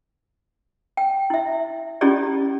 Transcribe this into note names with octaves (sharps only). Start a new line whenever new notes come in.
G5
E4 E5
C#4 E4 F4 G4 G#4 D5